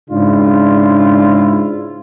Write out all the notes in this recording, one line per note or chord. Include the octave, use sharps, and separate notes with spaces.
G#2 C#3 D4 E4 F4